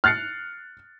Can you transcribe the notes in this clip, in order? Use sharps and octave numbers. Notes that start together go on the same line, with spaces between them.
F6 F#6 A6 C7 C#7